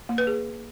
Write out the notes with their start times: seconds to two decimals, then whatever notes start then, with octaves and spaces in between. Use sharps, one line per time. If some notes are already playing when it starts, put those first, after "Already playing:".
0.09 A#3
0.18 B4
0.27 G#4